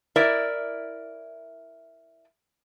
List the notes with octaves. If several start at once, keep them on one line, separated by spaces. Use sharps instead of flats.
E4 A#4 D5 E5